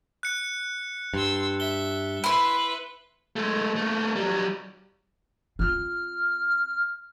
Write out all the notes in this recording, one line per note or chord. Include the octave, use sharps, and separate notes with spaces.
F#6 C#7
G2 C6 E6
E5 G7
E4 B4 E5 C6
G#3 A3
A3 A#3
F#3 G3
C4 F4 F6